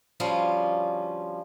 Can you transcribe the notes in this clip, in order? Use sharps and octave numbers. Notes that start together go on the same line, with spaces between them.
D2 F3 G3 C#4 F4